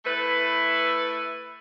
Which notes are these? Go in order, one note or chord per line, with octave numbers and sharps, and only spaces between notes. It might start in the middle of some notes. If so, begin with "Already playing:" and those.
A3 E4 B4